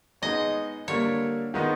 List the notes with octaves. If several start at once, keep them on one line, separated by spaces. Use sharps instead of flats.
G#3 B3 D#4 G#4 C#5 D#5
D3 G3 A#3 C#5
D#3 G#3 B3 D#4